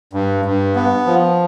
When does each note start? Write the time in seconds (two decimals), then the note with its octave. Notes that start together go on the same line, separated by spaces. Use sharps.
0.13 G2
0.45 G2
0.76 B3
1.06 F3